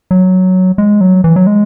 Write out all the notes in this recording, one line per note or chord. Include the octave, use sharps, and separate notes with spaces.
F#3
G#3
F#3
E3
F#3
G#3